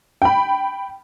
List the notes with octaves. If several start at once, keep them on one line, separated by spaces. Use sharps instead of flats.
G5 B5